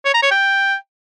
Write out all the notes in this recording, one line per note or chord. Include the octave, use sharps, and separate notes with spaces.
C#5
A#5
C#5
G5